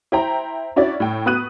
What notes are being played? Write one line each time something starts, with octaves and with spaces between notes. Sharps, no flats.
E4 C5 G5 A#5
C#4 D4 E4 F#4 C#5 D5
A2 G5
B3 F#4 D#6 F#6 D#7